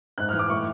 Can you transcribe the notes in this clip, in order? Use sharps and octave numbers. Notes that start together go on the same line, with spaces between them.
G#2 F#6
F6
E3
D6
A2 C#6